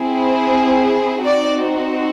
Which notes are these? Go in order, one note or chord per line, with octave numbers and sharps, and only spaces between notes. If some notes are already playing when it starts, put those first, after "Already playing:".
Already playing: C4 E4 G#4
C4 D#4 F#4 D5